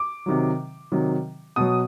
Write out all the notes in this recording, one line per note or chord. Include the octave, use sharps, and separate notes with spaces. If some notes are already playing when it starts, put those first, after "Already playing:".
Already playing: D6
C3 D#3 F#3
C3 D#3 F#3
B2 F#3 D#6